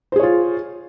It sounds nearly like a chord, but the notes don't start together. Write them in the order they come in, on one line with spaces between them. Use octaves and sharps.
C5 G#4 C#5 F4